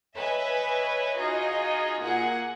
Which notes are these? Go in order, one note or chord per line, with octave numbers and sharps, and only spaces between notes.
B4 C#5 D#5 E5 G#5 B5
D#4 F4 F#4 G#4 D#5
A#2 A#3 G#4 F#5